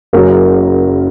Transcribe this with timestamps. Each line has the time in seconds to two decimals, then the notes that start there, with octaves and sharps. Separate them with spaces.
0.13 F#1 F#2 C#3 F#3 A#4